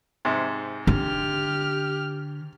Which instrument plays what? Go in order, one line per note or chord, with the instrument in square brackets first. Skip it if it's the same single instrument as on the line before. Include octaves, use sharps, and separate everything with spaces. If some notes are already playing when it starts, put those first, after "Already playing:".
[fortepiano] G#2 C3
[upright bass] D3 [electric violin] G4 F6